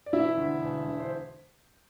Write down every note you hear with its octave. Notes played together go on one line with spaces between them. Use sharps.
D5
E1 E4 E5
D2 D3
E1
D2 D3
C5